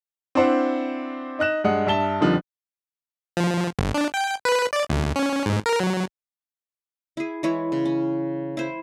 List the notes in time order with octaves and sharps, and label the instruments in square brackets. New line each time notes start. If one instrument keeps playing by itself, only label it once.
[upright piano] C4 D4 E4 C5 F#5
D#4 D#5 F#6 E7
G2 G#3 F#5 D#6
G2 E5 A5 G7
F2 D3 D#3 F3 G3
[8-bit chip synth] F3
G1
D4
G5
B4
D5
D2
C#4
G#2
A#4
F#3
[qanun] E4 G#4
E3 G#3 E4 C#5
C#3
C#4
E4 C5